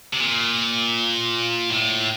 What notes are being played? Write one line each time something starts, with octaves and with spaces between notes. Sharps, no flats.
C3
A#2
A2